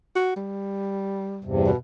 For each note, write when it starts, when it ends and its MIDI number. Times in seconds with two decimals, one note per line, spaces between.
0.16 0.32 66
0.36 1.55 55
1.44 1.71 40
1.44 1.71 43
1.44 1.71 48
1.66 1.77 47